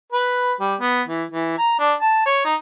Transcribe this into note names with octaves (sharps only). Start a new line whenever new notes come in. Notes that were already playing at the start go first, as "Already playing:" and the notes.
B4
G3
B3
E3
E3
A#5
D4
A5
C#5
D#4